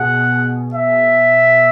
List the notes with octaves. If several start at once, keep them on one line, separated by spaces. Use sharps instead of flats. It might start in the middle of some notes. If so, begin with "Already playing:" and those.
Already playing: B2 G#4 F#5
E5